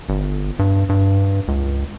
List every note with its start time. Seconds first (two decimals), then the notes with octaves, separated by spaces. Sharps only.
0.09 G1
0.59 G2
0.89 G2
1.48 C#2